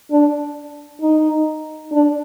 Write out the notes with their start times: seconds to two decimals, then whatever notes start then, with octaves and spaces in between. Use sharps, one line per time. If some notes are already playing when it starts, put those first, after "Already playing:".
0.11 D4
1.02 D#4
1.92 D4